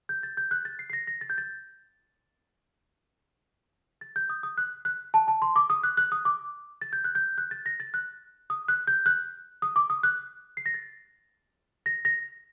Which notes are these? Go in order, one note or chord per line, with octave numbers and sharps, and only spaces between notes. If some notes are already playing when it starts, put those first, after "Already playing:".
G6
A6
G6
F#6
A6
C7
C7
A#6
A#6
A6
G6
A6
A6
G6
D#6
D#6
F#6
F#6
A5
A5
C6
D6
D#6
F#6
F#6
D#6
D6
A6
G6
F#6
G6
F#6
A6
A#6
A6
F#6
D#6
F#6
G6
F#6
D#6
D6
D#6
F#6
C7
A#6
A6
A#6
A#6